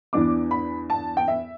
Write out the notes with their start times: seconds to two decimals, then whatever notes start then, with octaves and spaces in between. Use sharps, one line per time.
0.13 E2 E3 B3 D4 D6
0.51 B5
0.90 A5
1.17 G5
1.28 E5